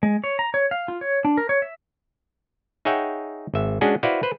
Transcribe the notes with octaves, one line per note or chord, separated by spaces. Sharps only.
G#3
C#5
A#5
C#5
F5
F4
C#5
D4
A#4
C#5
E5
D#4 G#4 C#5 E5 F#5 G5
G#1 E5
G#3 C#4 D4 F#4 G#4
E4 F#4 B4 C5 D5 F5
B4 C5